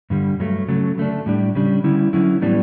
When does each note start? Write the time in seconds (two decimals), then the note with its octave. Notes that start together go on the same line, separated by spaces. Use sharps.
0.10 G2 D3 G3
0.40 G2 F#3 A3
0.68 C#3 F#3 A3
0.98 D3 A3 D4
1.26 A2 G3 D4
1.55 C#3 G3 D4
1.84 D3 G3 C#4 E4
2.13 D3 F#3 C#4 E4
2.42 A2 E3 G3 B3 D4